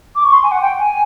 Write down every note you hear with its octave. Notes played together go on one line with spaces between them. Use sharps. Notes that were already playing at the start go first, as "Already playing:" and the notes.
D6
C#6
C6
G#5
F#5
G5
G#5